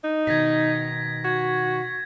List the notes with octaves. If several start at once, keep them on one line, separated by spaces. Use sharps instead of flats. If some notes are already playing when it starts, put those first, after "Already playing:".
D#4
B2 D#3 G#6 A#6 B6
F#4 G#6